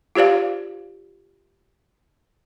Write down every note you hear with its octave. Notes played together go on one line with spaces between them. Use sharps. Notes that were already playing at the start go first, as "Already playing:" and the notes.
F4 G4 C5 D5 F5